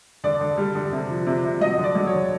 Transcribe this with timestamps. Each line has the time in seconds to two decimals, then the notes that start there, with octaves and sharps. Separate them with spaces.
0.24 D3 D5
0.41 D3
0.57 G3
0.75 D3
0.92 C3
1.10 F3
1.26 C3
1.44 C3
1.61 F#3 D#5
1.77 D3
1.84 D5
1.95 F#3
2.07 C#5
2.12 D3